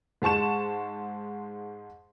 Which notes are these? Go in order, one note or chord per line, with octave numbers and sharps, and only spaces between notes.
G#2 G#3 A5 C#6 E7